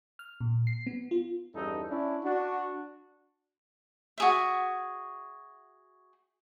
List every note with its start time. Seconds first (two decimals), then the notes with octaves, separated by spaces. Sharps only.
0.19 F6
0.41 A#2
0.67 C7
0.86 B3
1.11 F4
1.54 E2 G2 C#4 D#4 A4
1.89 C#4 D4 E4
2.23 D4 F#4
4.18 F#4 G#4 E5